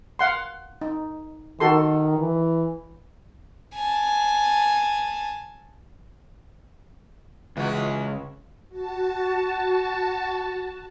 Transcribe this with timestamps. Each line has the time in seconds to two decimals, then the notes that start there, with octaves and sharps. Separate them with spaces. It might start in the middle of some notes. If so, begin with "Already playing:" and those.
0.19 F5 F#5 C6
0.81 D#4
1.60 D#3 F#4 A4 C6
2.17 E3
3.75 G#5 A5
7.57 C#2 E3 G#3 F#4
8.69 F#4 A5